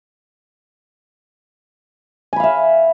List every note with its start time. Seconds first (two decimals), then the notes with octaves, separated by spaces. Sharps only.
2.33 G#5
2.36 B5
2.40 F5
2.43 E5